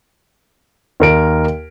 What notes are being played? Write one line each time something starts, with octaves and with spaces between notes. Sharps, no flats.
D#2 A#4 D7